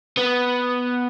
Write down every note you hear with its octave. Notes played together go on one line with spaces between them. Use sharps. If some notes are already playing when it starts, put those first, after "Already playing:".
B3